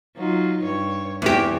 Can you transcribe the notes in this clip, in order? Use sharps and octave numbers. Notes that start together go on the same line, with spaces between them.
F#3 D#4 F4
G2 C#5
E2 E3 C4 G4 C#5